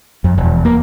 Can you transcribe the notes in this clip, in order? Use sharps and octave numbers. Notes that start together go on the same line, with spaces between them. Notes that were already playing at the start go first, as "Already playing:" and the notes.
F2
E1
A#3